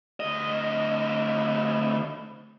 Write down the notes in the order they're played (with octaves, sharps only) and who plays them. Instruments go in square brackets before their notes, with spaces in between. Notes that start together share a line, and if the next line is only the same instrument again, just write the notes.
[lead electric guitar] D2 D#5